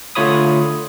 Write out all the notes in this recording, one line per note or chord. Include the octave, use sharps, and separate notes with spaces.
D3 A3 F4 C#5 B5 D#6